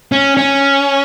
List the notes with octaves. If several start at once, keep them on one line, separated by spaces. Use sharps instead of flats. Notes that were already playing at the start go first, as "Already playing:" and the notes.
C#4
C#4